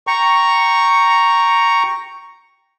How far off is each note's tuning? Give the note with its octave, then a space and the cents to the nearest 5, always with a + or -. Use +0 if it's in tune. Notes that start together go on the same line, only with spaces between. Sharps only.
G5 +0 A#5 +0 C#6 +0